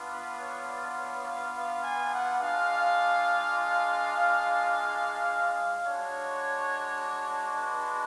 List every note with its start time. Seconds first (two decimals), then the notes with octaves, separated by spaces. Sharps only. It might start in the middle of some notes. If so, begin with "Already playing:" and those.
Already playing: B3 D4 F4
0.11 B4
0.39 C#5
0.68 D5
0.97 C#5
1.26 F5
1.55 F5
1.83 G#5
2.12 F#5
2.41 G#3 D4 F4 F5
5.86 G#3 D4 F#4 C#5
7.58 B4